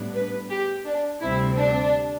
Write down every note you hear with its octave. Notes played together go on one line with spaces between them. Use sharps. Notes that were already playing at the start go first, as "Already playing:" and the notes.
Already playing: A2 G3 B3 D4
B4
G4
D4
D2 C3 G3 C4 E4
D4